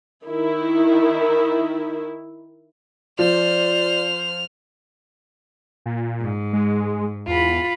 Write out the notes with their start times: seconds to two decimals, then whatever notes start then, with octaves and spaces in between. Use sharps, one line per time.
0.24 D#3 E4
3.19 F3 C5 D5 F6
5.86 A#2
6.19 G#2
6.53 G#3
7.27 E2 F4 B5